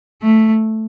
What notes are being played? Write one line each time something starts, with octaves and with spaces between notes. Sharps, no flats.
A3